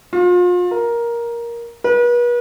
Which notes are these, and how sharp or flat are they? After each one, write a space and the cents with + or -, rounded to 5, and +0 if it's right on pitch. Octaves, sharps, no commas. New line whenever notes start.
F4 +35
A#4 +10
B4 -40